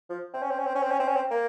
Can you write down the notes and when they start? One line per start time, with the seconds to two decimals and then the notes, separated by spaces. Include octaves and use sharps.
0.10 F3
0.34 C4
0.42 C#4
0.51 C4
0.59 C#4
0.66 C4
0.75 C#4
0.83 C4
0.91 C#4
1.00 C4
1.08 C#4
1.16 C4
1.30 A#3